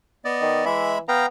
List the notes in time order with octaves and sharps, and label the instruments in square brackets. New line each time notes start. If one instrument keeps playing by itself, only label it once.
[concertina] B3 D5 D#5
[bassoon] D#3
[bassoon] E3 [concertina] G#3 E5 B5
[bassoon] B3 [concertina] F5 G5 A#5